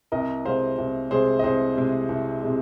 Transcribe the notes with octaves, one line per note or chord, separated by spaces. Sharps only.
C2 A#4 D#5
C3 G#3 C5 F5
C2
C3 G#3 G#4 C5
D#5
C2 G#4 C5
C3 G#3
C2
C3 G#3